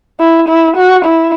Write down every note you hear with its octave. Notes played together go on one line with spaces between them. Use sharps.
E4
E4
F#4
E4